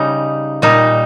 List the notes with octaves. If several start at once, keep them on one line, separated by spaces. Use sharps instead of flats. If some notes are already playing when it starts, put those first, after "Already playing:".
Already playing: C#3 G3 D#4
A#2 G3 D#4